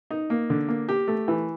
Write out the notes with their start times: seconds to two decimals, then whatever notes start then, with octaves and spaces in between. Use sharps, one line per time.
0.11 D#4
0.30 A#3
0.50 D3
0.68 A#3
0.89 G4
1.08 A3
1.28 E3